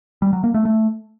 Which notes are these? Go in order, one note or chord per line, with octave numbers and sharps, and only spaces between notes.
G3
F#3
A#3
A3
A3